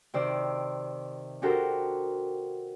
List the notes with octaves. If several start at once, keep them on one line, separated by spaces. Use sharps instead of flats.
C3 D#3 C5 D5 E6
D4 F#4 G4 A4 A#4 C5